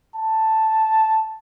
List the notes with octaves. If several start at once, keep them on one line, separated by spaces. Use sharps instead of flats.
A5